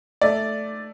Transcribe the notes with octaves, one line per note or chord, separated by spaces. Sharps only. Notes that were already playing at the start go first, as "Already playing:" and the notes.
A3 D5